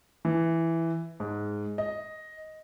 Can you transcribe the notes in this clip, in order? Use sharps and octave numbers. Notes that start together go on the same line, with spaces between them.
E3
G#2
D#5